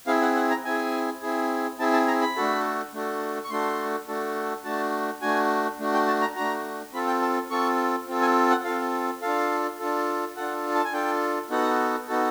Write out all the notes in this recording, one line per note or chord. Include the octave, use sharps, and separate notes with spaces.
C4 E4 G#4 F5
F#5
F#5
A#5
C4 E4 G#4 G#5
C4 E4 G#4
C4 E4 G#4 A5
A5
A#5
B5
A3 D4 F#4 A4
A3 D4 F#4 A4
C#6
A3 D4 F#4 A4 C6
A3 D4 F#4 A4
A3 D4 F#4 A5
A3 D4 F#4 G#5
A3 D4 F#4
G5
A5
A#5
A3 D4 F#4 A#5
C4 F4 A4 B5
G5
A5
C4 F4 A4 C#6
C4 F4 A4
G#5
F#5
C4 F4 A4 F5
D4 F4 A4 F5
D4 F4 A4
D4 F4 A4 F#5
A5
G#5
D4 F4 A4 G5
B3 D#4 F#4 A4 F#5
B3 D#4 F#4 A4